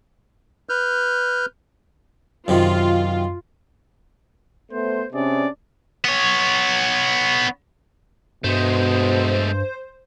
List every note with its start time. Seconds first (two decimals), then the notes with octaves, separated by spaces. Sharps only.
0.69 B4 F6 G6
2.48 F#2 C3 D#3 F4
4.72 A3 B3 C5
5.13 C3 C#4 D4 G#4 D5
6.05 B3 C#5
8.44 G2 B2 G#3 A3 C5